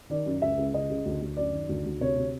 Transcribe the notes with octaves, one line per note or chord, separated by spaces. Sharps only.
D#3 D5
F#2
C#2 E5
C#2
C#3 D#5
C#3
D2
D2
F#2 D5
D#3
D2
D2
C3 C#5
C3